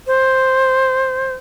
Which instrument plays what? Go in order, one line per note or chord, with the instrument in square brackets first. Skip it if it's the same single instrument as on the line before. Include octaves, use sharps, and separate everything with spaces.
[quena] C5